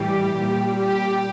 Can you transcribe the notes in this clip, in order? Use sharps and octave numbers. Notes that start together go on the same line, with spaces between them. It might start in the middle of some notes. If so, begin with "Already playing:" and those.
Already playing: A2 E3 G3 G4
A#2 G3
G4